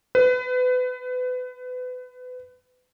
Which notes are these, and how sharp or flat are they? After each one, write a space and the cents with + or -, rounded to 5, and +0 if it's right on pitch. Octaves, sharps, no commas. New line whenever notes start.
B4 +30